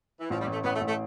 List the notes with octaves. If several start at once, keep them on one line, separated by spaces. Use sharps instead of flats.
E3
A1 F3
G3
A1
A3
A1 B3
A3
A1
A3